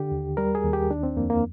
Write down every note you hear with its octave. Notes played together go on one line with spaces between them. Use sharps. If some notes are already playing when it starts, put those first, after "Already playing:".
Already playing: D3 G4
D#2
G3 A#4
G#4
D#2
G4
D#3 D4
C4
F2 A#3
A#3